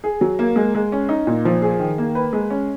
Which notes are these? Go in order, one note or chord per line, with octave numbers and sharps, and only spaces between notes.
G#4
F#3
A#3
G#3
G#3
C#4
D#4
A#2
F3
G#4
D#3
A#3
B4
G#3
C#4